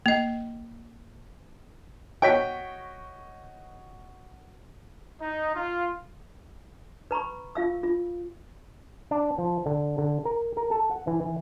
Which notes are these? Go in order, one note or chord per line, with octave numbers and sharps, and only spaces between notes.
A#3 D#5
F#4 C#5 D#5 G5 B6
D#4
F4
B4 A#5 B5 C#6
F4 F5 E6
F4
D4
F3
D3
D3
A#4
A#4
A4
F#5
E3
E3